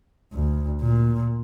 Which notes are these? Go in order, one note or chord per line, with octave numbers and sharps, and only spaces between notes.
D2
A#2